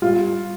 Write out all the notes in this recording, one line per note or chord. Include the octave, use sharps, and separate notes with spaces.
G3 F4